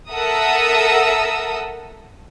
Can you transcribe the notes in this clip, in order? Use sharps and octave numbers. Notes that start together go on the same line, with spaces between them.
A4 A#4 E5 F#5 D#6 E6